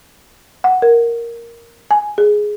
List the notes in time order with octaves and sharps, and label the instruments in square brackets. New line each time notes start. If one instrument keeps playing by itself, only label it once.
[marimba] F#5
A#4
G#5
G#4